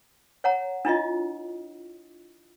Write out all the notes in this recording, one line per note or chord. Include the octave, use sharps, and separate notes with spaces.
C#5 F#5 A#5
D4 E4 F4 D#5